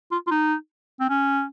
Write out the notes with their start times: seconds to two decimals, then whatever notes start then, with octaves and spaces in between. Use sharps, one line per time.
0.12 F4
0.27 F4
0.31 D#4
1.00 C4
1.09 C#4